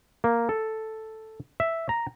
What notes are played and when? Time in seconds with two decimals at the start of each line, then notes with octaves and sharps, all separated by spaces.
0.24 A#3
0.49 A4
1.60 E5
1.89 A#5